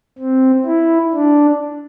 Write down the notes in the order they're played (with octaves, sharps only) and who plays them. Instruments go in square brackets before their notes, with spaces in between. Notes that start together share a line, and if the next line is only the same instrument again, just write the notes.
[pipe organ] C4
E4
D4